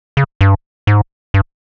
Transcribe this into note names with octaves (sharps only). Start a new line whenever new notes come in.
C#3
G2
G#2
G2